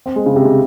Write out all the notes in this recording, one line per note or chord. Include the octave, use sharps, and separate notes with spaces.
C4
G#3
C#3
C3
C#3